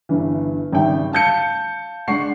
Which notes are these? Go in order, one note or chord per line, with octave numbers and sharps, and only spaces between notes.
G1 G2 E3
G#1 C#3 G3 E5 G5
F5 A5 G6 C#7
G#3 D4 F#5 C#6 C7